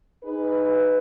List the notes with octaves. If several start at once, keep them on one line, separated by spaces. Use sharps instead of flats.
D#4 G#4 B4